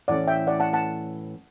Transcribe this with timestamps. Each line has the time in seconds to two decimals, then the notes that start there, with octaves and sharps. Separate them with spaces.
0.08 A2 E3 A3 C#4 D5 F#5
0.28 E5 G5
0.47 D5 F#5
0.60 F#5 A5
0.73 F#5 A5